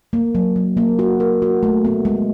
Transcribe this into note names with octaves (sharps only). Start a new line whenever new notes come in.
A#3
F#3
F#3
A#3
F#4
A#4
F#4
A3
B3
G#3